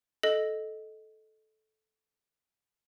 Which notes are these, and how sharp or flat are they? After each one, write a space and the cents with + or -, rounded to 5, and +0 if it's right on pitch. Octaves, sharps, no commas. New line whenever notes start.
A4 -15 D#5 +0